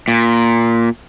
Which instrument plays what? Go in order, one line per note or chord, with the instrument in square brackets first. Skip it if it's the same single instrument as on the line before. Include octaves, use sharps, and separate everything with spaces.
[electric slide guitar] A#2